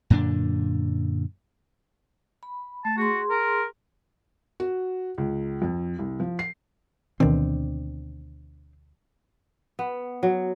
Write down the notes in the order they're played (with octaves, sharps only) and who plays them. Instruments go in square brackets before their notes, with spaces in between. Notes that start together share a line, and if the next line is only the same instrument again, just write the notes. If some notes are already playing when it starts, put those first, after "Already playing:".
[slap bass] F#2 A#2 D3 D4
[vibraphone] B5
[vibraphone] A3 [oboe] A5
[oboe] F#4 [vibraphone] G#4 C6
[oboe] A#4
[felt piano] F#4
C#2
F2
C2
F3
C7
[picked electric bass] D2 B2 [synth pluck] D#3 E3 [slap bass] C4 D4
[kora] B3
F#3